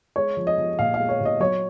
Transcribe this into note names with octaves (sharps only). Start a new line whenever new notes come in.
G#3 C#5
F3
D#5
F3
A#2 F5
G#3 F5
C#5
A#2
D#5
F#3 C#5